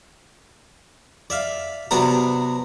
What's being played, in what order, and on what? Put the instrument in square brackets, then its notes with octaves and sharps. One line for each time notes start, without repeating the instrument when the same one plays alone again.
[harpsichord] D5 E5 F5
C3 F#3 B3 D4 D5 A#5